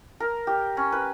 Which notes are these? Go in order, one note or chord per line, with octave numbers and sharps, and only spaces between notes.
A#4
G4
C#4
B4